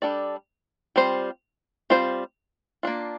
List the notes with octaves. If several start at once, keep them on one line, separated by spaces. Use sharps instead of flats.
G3 D4 A4 D5
G3 C4 F4 C5
G3 C4 F4 C5
A#3 D4 F4